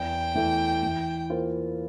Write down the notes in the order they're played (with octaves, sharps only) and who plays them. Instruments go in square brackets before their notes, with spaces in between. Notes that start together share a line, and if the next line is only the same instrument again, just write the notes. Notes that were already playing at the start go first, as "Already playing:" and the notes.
Already playing: [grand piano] E2 [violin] G5
[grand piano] E3 A3
E3
A#3 F4 C5